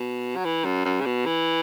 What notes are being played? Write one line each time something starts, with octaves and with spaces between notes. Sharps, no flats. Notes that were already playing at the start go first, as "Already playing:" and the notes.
Already playing: B2
F#3
E3
F#2
F#2
C#3
B2
E3